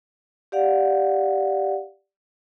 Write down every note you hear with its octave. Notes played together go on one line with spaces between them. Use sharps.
G4 D5 F5 F#5